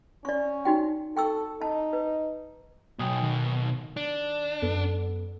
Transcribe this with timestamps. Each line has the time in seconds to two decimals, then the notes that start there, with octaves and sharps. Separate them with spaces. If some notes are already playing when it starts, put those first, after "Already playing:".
0.25 C#4 D5 C#6
0.65 D#4 F#4 G5
1.17 A4 G5 C#6 E6
1.62 D#4 A5
1.93 B4
2.99 B1 B2 G5 G#5 D#6
3.22 D#3
3.97 D4
4.62 F#2 B3 A4